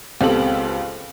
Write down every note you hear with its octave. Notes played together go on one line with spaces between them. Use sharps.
C#2 B3 C4 G4 A4 F#7